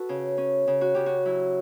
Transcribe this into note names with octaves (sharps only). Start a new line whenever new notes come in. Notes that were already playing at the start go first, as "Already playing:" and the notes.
Already playing: F#4 A4 B4
C#3
C#4
C#3
F#4
C#3 G4
F#4
F#3 E4